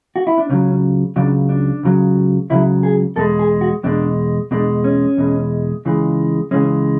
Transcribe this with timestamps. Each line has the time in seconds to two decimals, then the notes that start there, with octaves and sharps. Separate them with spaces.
0.16 F#4
0.27 E4
0.38 D4
0.49 C#2 C#3 F#3 C#4
1.16 C#2 C#3 F#3 D4
1.49 D4
1.83 C#2 C#3 F#3
2.50 C#2 C#3 F#3 E4
2.83 G#4
3.16 E2 B2 G#3 A4
3.39 G#4
3.61 F#4
3.83 E2 B2 G#3 D4
4.51 E2 B2 G#3 D4
4.84 C#4
5.17 E2 B2 G#3
5.85 C#2 C#3 E3 G#3
6.51 C#2 C#3 E3 G#3 C#4